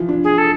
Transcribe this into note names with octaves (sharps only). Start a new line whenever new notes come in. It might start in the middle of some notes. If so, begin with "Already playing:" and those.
Already playing: E3 F3
D4
G#4
A4